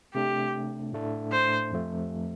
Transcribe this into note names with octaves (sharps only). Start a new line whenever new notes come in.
C3 A3 D4 G4
A2 A3 D4
C5
F2 F3 A3